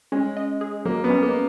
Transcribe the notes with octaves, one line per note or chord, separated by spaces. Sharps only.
G#3 C#4
D#5
G#4
F#3 A#3
B3
C#4
A#3